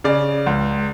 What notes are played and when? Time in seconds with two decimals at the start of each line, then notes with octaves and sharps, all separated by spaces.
0.04 C#3 D5
0.46 C#2